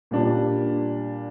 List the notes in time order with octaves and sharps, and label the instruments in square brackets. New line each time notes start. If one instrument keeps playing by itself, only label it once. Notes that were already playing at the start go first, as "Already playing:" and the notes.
[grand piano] A#2 G3 D4